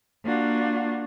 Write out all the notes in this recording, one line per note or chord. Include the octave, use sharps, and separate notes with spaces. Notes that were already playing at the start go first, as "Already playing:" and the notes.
A#3 D4 F4 F#4